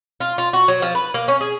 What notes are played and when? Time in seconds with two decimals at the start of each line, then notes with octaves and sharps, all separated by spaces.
0.20 F4
0.38 F4
0.53 F#4
0.68 F#3
0.82 F3
0.95 B4
1.14 A#3
1.28 C#4
1.41 G#4